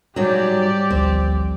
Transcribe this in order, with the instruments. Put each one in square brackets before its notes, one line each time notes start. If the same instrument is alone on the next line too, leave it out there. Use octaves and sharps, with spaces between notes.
[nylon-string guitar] G#2 F#3 [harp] G3 [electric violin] G4 D5
[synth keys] A1 D2 F3 [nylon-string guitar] C4